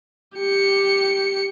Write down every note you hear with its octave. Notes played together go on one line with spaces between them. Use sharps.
G4 C#7